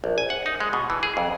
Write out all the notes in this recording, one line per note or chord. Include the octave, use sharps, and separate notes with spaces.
A#1
G#5
F#5
D#4
G#3
B2
E3
G#4
F2